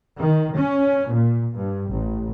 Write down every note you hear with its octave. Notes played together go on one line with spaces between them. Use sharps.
D#3
C#4
A#2
G2
A1